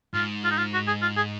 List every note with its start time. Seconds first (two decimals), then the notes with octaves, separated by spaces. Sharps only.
0.14 G#2 F4
0.44 F4
0.51 D#4
0.58 F4
0.73 F#4
0.87 G#4
1.02 F4
1.17 G#4